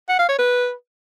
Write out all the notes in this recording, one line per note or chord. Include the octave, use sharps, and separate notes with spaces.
F#5
F5
C#5
B4